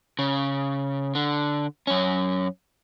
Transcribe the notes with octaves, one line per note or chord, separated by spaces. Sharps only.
C#3
D3
F#2 C#4